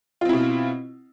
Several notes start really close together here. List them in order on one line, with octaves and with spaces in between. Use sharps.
F4 C4 E4 B2